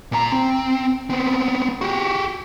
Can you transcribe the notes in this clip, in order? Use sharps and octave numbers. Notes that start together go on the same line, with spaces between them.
A#2 A#5
C4
B3 C4
F#4 G4